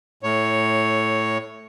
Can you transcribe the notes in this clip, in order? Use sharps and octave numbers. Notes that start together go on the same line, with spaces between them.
A2 C#5